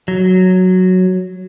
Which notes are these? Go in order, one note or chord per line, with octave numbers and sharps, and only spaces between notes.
F#3